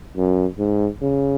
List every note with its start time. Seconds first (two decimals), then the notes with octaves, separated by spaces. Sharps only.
0.17 F#2
0.58 G#2
1.01 C#3